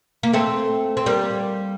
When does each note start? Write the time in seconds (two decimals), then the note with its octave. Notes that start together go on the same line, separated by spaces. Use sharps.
0.23 A#3
0.33 A3 C4
0.97 C4
1.06 G3 A#3